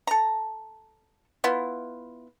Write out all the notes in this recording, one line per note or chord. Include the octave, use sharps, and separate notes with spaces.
A4 A#5
B3 E4 F4